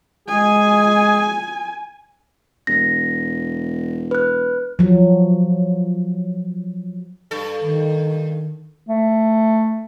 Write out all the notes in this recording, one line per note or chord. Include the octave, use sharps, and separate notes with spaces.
G#3 G#4 G#5
E1 A#6
B4 F#6
F3 F#3
G2 A4
D#3
A3